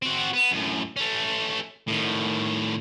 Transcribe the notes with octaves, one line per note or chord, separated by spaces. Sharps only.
C4 F#4
B3
F#2 A2
A3 C#4
A2 D#3